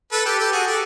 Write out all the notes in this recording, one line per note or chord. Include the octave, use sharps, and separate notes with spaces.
A4 B4
G4 A4
G4 A4
F#4 G#4
G4 A4